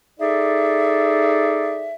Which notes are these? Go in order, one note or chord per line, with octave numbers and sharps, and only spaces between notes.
D#4 G#4 A4 D5 E5